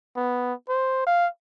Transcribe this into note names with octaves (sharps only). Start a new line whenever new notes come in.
B3
C5
F5